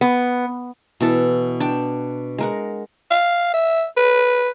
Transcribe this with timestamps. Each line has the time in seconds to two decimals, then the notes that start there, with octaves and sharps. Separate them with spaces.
0.01 B3
1.00 B2 E3 A4
1.60 D4 G5
2.38 G#3 A#4 F#5
3.11 F5
3.54 E5
3.97 B4